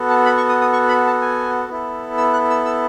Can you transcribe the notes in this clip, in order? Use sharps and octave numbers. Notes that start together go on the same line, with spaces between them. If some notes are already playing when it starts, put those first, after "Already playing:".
Already playing: B3 F#4 A4
A5
B5
C#6
D#6
D#6
C#6
B5
A5
G#5
B3 E4 A4
E6
F#6
E6
E6